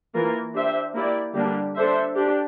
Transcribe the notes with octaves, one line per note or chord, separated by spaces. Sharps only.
E3 A#3 F4 A#4
D4 G4 C5 E5
A#3 E4 G4 D5
D3 G3 A#3 D4 G4
D4 A4 C5 E5
D4 G4